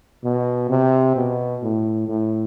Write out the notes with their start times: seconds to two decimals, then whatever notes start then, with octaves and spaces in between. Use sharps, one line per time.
0.24 B2
0.69 C3
1.16 B2
1.62 A2
2.08 A2